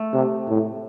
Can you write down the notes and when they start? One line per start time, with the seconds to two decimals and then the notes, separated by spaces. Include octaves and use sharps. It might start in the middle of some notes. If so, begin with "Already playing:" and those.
Already playing: A3
0.13 C3
0.48 A2